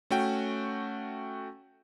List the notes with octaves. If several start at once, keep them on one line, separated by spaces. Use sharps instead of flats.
A3 C#4 F#4 G5